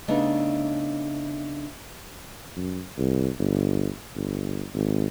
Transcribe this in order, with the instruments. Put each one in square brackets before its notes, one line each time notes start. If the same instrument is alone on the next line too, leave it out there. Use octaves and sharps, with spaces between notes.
[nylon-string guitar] C#3 A3 B3 D4 D#4
[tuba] F#2
C2
G1
G1
G#1